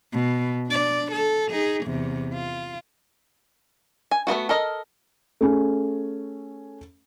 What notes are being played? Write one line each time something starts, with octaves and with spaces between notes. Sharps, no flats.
B2
D4 D5
A4
D#4 G#4
E2 C3
F4
G#5
A3 B3 F4 F#4
A4 A#4 D#5
A3 C#4 G#4